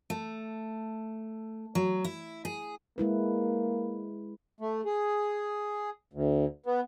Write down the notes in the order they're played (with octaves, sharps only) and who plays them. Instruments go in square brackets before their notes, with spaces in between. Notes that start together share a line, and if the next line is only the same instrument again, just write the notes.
[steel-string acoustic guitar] A3
F#3
E4
G#4
[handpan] G#3 E4 B4 [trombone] A#3
[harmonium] A3
G#4
D2
B3